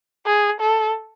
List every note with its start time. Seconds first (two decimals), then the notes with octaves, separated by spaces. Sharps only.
0.26 G#4
0.61 A4